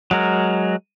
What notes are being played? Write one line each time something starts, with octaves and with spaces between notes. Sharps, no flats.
F#3 G#3 A#4